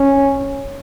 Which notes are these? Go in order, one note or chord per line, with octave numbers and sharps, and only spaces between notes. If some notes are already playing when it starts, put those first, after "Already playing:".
Already playing: C#4